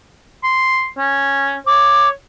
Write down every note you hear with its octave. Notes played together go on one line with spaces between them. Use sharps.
C6
C#4
C#5 D6